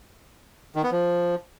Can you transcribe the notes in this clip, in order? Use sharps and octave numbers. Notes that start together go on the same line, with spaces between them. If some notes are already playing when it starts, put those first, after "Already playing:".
D#3
B3
F3